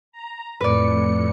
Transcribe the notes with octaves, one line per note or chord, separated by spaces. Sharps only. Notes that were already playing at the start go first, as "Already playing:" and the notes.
A#5
F2 A2 B4 D5 C#7